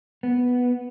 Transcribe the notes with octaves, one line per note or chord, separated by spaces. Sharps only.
B3